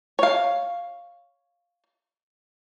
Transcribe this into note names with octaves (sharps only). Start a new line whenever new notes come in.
C#5 F5